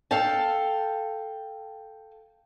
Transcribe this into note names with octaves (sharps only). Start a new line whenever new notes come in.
A4 F5 G5 A5